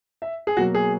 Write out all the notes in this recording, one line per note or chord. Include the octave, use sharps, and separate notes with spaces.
E5
G#4
B2 F#3 A#3 F#4
G#4